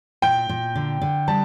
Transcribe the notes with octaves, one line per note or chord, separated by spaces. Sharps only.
A#2 G5
A#2
D3
D3
G3 A5